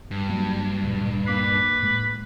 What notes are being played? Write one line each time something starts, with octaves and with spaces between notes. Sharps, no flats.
G2
F#3 A#3
D2 A#2
A#3 B4 D6 C7
A2 G#3